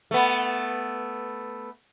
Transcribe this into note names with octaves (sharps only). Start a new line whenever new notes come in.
A3 B3